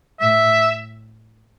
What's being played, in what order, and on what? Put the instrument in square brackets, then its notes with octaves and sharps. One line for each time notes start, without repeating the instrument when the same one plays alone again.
[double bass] A2 [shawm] E5